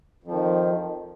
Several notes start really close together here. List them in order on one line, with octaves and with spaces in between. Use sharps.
F2 F3 D#3